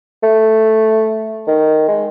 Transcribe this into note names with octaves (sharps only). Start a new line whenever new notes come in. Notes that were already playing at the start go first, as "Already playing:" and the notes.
A3
D#3
G#3